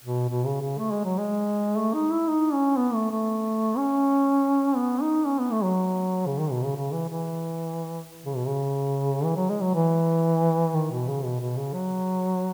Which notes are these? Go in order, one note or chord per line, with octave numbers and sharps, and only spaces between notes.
B2
B2
C#3
C#3
A3
G#3
F#3
G#3
A3
D#4
E4
D#4
C#4
B3
A3
A3
C#4
B3
D#4
C#4
B3
A3
F#3
C#3
D#3
B2
C#3
C#3
E3
E3
C#3
B2
C#3
E3
F#3
G#3
F#3
E3
D#3
B2
C#3
B2
B2
C#3
F#3